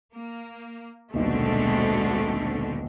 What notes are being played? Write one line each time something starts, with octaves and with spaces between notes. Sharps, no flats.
A#3
D#1 B1 B2 D3 G#3 A3 C4